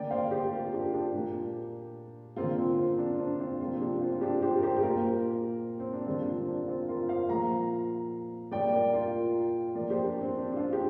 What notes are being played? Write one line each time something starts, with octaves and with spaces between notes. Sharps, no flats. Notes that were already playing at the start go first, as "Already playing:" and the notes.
Already playing: D3 A#3 D5 G5
C5 F5
G4 C5
F4 A#4
D4 G4
D4 G4
A#2 A#3
D3 A#3 C4 F4
C4
C4
D4
D4
C4 F4
C3 F3 A#3 C4 F4
D4 G4
C4 F4
F4
D4 G4
G4 C5
A#4
G4 C5
G4
A#2 A#3 F4 A#4
C4
D4
D3 G3 A#3 C4 F4
D4
D4
C4 F4
F4 A#4
C5 F5
A#2 F3 A#3 F5 A#5
A#2 G3 A#3 D5 G5
A#4 D5
F4 A#4
A#2 F3 A#3 A#4 D5
G4 C5
D4
C4
D4
D4
C4 F4
G4